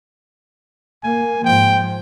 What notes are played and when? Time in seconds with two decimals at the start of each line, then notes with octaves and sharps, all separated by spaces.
1.04 A#3 G#5
1.44 G#2 F3 G5